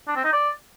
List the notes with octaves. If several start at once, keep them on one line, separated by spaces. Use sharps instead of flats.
D4
C4
D#4
D5